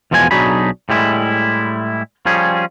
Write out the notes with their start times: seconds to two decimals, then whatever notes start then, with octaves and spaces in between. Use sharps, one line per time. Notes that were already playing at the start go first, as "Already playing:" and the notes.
0.11 E2 B2 F3 G#3 A4 G#5
0.31 B1 F#3 D4 D#4 G#4 B5
0.89 A2 G3 G#3 E4
2.26 F3 G3 C#4 G#4